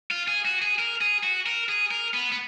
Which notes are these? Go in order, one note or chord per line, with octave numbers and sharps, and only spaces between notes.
F4
G#4
F#4
G#4
A#4
G#4
F#4
A#4
G#4
A#4
B3
B3